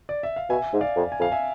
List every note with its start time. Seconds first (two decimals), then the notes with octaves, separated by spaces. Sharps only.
0.09 D5
0.23 E5
0.36 F5
0.50 B2 E5 G#5
0.73 G#2
0.81 D5 F5
0.96 F2
1.12 G#5
1.20 F2 F5
1.32 E5 G#5